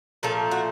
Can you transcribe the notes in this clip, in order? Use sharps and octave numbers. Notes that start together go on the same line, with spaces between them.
A#2 F3 A3 A4
F#4